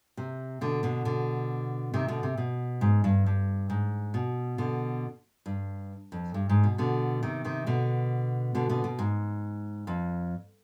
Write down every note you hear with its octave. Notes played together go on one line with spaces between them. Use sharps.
C3
B2 D3
B2 D3
B2 D3
C3 D#3
B2 D3
C3
B2
G#2
G2
G2
G#2
B2
B2 D3
G2
F2
G2
G#2
B2
B2 D3
C3 D#3
C3 D#3
B2 D3
B2 D3
B2 D3
B2
G#2
F2